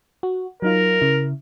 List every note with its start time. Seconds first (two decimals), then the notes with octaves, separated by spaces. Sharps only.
0.23 F#4
0.62 F#3 D#4 F4 A#4
1.01 C#3 E4